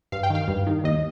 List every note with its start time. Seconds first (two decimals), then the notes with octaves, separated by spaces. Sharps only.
0.12 G2 F5
0.23 G5
0.30 D#3
0.35 F5
0.48 G2
0.67 D#3
0.84 D#2 D#5